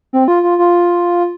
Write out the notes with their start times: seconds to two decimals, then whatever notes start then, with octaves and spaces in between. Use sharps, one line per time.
0.13 C4
0.28 F4
0.43 F4
0.59 F4